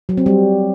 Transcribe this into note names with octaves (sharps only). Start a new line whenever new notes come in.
F#3
C4
G3